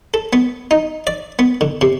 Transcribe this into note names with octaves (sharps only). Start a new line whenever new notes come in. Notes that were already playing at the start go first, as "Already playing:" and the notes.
A4
B3
D#4
D5
B3
D3
C3